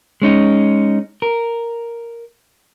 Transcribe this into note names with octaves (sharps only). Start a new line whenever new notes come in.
G#3 C#4 D#4
A#4